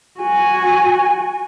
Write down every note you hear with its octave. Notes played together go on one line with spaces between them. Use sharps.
F#4 G#5